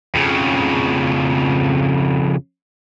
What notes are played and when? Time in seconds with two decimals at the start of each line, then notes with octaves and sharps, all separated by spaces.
0.15 F2 C#3